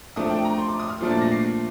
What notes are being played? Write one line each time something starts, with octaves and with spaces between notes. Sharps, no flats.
F3 A3 D4 D#6
G5
A#5
C6
D6
D#6
F6
A#2 F3 A3 D4
A6
A#6
C7